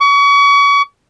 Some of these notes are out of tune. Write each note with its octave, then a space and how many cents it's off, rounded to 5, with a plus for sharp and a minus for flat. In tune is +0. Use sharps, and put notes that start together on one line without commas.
C#6 +35